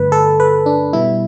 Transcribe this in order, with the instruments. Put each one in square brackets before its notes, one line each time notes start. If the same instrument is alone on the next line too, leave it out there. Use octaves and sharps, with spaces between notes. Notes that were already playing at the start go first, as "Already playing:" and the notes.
Already playing: [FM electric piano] G2 D3 A3 B4
A4
B4
D4
B2 G3 B3 E4